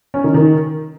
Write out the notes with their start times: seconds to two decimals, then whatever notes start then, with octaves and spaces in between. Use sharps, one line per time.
0.14 C#4
0.24 D#3
0.34 D#3